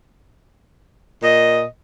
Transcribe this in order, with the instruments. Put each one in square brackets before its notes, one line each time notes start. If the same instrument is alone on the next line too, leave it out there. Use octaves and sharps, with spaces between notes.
[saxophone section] A#2 D#5